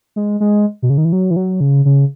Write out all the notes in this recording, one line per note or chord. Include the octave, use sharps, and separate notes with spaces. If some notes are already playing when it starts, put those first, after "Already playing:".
G#3
G#3
B2
C#3
D#3
E3
F#3
E3
F#3
C#3
C#3